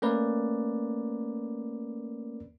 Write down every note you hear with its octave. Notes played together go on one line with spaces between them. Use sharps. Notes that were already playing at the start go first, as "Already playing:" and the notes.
A3 A#3 C#4 A#4 B4 D5